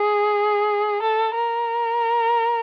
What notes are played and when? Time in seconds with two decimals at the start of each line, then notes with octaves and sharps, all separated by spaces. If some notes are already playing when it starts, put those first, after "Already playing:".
Already playing: G#4
1.03 A4
1.35 A#4